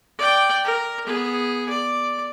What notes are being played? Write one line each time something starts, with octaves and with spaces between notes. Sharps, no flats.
D5 G5
A#4
B3 G#4
D5